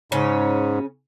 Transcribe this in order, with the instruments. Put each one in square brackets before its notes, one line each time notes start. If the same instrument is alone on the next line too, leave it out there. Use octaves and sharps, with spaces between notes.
[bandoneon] G#2 [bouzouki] C#3 C#4